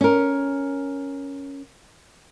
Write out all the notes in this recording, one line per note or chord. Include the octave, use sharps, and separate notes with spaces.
C#4 A#4